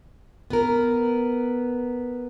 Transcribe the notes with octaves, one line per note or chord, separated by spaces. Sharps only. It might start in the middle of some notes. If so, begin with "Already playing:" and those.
B3 A#4